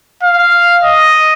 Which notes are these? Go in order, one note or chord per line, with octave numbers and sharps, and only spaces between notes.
F5
D#5